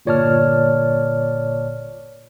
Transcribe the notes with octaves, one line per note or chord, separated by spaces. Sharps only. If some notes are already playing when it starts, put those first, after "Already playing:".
G1 A#2 C#5 D5 A5 F6